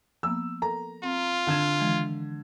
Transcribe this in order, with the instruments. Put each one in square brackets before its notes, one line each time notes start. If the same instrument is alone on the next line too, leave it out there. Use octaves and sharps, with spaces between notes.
[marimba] F3 A#3 B3 [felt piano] E6
[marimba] A4 A#4 [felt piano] A#5
[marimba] C4 [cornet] F4
[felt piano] D3 G#6 E7
[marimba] D#3 E3 G#3